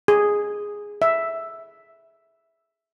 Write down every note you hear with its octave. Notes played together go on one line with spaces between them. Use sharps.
G#4
E5